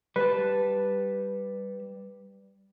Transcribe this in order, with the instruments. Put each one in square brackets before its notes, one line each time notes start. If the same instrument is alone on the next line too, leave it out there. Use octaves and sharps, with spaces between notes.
[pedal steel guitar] G3 A5 [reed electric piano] B4